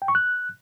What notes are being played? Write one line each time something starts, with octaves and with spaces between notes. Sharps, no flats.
G5
C#6
F#6